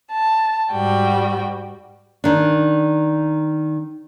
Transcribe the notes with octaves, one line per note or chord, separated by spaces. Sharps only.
A5
G#2 G3 F#4 G5
D#3 D4